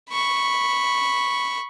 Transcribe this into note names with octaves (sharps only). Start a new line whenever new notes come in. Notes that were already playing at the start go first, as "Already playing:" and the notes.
B5 C#6